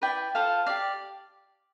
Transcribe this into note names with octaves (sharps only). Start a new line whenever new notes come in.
E4 B4 D5 G5
F4 A4 C5 F5
G4 D5 F5